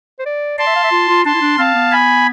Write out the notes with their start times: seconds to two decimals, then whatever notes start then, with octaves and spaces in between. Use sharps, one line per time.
0.19 C5
0.26 D5
0.58 D5 A5 C6
0.67 E5
0.76 F5
0.84 E5
0.92 F4
1.09 F4
1.25 D4 A5 C6
1.34 E4
1.41 D4
1.58 C4 F5 A5
1.75 B3
1.92 G#5 B5